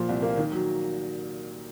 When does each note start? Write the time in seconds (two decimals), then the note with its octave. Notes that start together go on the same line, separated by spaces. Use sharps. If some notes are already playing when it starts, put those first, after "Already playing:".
Already playing: A#2 F3
0.09 C2
0.22 A#3
0.37 D#3
0.52 F#3